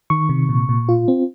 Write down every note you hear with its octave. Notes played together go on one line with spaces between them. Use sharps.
D#3 C#6
C3
A#2
A#2
F4
C4